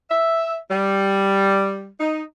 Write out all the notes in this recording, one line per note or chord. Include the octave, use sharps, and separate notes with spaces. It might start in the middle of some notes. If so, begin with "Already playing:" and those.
E5
G3
D#4